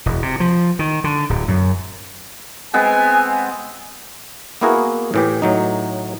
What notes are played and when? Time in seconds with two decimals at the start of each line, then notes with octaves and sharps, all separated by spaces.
0.06 E1
0.22 C3
0.40 F3
0.79 D#3
1.04 D3
1.30 D1
1.48 F#2
2.74 G#3 B3 C4 G#5
4.61 A#3 B3 E4 F#4 G#4 A#4
5.14 A2 E3 G4
5.42 A2 F#3 D#4